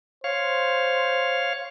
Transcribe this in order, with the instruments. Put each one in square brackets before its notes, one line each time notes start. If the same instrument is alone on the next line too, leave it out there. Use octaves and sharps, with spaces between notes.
[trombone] C5 [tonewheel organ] C#5 F5